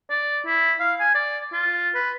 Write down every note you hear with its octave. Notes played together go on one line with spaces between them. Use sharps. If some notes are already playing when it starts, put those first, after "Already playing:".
D5
E4
F5
G#5
D5
F4
B4